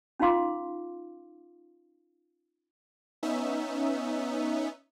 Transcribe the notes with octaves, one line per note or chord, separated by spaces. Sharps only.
C#4 D#4 F4 F5 C6 D6
B3 C#4 D#4 E5